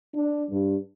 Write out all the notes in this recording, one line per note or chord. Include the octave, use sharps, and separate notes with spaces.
D4
G2